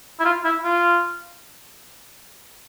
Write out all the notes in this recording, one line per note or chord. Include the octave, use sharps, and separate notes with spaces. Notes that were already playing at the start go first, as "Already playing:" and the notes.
E4
F4
E4
F4